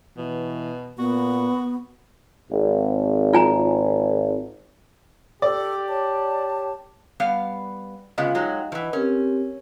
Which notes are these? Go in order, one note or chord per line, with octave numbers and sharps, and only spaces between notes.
B2 E3
A#2 B3 F#4
G#1
F4 G#5 A#5
G4 A4 D5
C#5 A5
G3 B3 F5
C#3 G#3 B3 F4 D#5 F5
F#3 G#3 D#4 F#4 G5
E3 F3 B4 D#5 F#5
C4 C#4 G4 A#4